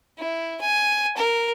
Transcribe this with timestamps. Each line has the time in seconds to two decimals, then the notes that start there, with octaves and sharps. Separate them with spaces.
0.18 E4
0.61 G#5
1.17 A#4